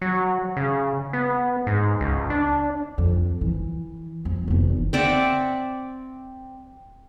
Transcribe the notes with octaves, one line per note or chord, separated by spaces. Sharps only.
F#3
C#3
B3
G#2
C#2
D4
F2
E3
F2
F1 E2
C4 D5 E5 F#5